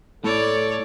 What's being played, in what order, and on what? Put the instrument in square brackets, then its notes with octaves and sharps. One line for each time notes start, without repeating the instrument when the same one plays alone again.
[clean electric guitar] A2 [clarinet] A4 [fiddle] C#5 D5